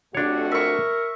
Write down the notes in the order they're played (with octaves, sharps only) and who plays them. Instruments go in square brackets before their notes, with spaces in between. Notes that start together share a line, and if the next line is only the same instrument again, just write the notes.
[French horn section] F2 A3 F#4 [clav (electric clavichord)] D4 C#5 [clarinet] G4
[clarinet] A#4 [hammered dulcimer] E5 C#6